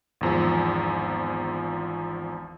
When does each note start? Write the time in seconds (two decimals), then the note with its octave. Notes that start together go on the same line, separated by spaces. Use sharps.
0.21 G#1 E2 F3